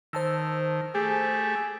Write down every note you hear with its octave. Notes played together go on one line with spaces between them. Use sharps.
D#3 C5 A5 E6
A3 G4 G#4